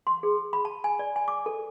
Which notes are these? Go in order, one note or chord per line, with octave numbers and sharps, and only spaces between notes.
C6
G#4
B5
A5
G#5
D5
G#5
D6
A4